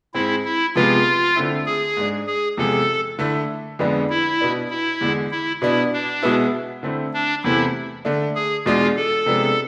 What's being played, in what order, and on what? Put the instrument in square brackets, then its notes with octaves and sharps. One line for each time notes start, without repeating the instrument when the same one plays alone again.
[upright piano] G#2 G#3 C4 [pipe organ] E4
[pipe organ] E4
[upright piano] C3 F3 G#3 B3 [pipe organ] F4
[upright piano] D3 A3 C4 E4
[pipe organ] G#4
[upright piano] G#2 G#3 D4
[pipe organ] G#4
[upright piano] E2 C3 F3 G#3 [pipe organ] A4
[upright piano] D3 A3 E4
F2 D3 G#3 B3 D4
[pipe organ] E4
[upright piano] B2 B3 D4
[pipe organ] E4
[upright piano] E2 D3 G#3 D4
[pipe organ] E4
[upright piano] B2 B3 D4 [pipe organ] E4
[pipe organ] D4
[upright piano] B2 G#3 B3 E4
D3 A3 C4 E4
[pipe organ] D4
[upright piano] E2 C3 E3 A3 C4 [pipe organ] E4
[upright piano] D3 A3 D4
[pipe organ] G#4
[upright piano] E2 B2 G#3 D4 [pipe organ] F4
[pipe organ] A4
[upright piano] C3 F3 G#3 B3 D4